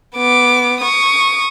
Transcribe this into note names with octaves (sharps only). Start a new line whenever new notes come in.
B3 D6
C#6 D#6